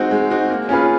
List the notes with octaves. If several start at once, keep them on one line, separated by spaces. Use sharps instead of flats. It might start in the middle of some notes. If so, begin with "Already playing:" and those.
Already playing: G#3 C4 D#4 F#4
G#3
C4 D#4 F#4
A#3
C#4 F4 G#4 B4